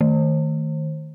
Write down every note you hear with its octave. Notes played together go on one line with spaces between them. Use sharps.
D#3